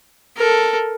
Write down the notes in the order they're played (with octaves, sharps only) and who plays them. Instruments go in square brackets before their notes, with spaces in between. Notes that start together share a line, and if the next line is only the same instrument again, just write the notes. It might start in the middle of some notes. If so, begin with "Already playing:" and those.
[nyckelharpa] A4 A#4